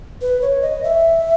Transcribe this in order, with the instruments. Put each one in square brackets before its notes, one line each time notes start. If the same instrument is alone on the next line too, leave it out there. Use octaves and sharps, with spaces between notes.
[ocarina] B4
C#5
D#5
E5